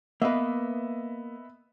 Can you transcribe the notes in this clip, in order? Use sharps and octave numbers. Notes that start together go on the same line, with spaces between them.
A#3 B3 B4 D#5 E5